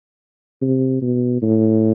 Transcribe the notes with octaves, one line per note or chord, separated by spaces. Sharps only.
C3
B2
A2